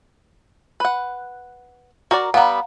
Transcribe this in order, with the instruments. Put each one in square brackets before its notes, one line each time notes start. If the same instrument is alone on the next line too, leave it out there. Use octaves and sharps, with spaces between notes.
[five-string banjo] B4 F#5
[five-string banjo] F#4 A#4 D5 [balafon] A#5
[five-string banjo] G3 B3 [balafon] F5 F#5 A#5